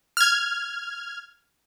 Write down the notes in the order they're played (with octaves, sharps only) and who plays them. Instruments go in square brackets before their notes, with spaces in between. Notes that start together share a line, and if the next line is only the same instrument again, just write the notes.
[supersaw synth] F6 G#6